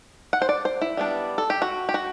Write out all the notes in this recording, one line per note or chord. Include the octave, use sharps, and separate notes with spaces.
F#5
C5
D5
C5
E4
G3 B3 D4
A4
G4
F#4
G4
F#4